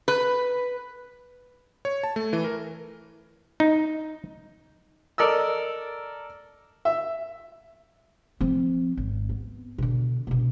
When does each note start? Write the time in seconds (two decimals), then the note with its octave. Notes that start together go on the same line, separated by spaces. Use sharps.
0.08 B4
1.85 C#5
2.03 A5
2.16 A3
2.33 E3
2.44 A#4
3.60 D#4
5.18 A4 A#4 D5 D#5 E6
6.85 E5
8.41 F3 C4
8.97 G#1
9.29 B3
9.78 B2 D3
10.27 E1 B2